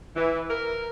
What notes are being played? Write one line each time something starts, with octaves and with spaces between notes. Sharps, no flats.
E3
A#4